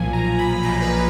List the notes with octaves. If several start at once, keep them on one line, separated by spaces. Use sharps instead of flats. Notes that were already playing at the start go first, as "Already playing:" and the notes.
Already playing: B1 A#2 F3 G#5
A#5
B5
B1 A#2 F3 A#5
B4